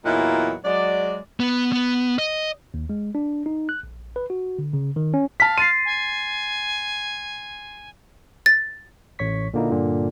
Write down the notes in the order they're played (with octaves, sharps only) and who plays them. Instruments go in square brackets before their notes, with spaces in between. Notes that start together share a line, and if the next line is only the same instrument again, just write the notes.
[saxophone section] E2 A#2 F#3 D#4 E4 F#5
F#3 G#3 D5
[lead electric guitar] B3
B3
D#5
[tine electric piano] D#2
G#3
D4
D#4
F#6
A#1
B4
F#4
D3
C#3
D#3
C#4
[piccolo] F5 [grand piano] A5 B6
[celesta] C6 A6 C7 [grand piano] D#7
[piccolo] G#5
[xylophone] A6
[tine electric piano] A1 C#5 C#6 B6
A#2 D3 A#3 D#4 E4
G2 A#2 D3